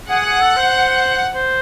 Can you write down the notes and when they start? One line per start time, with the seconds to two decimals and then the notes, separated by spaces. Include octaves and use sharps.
0.09 G#4 F#5
0.25 G#4
0.41 A4
0.56 C5
1.35 C5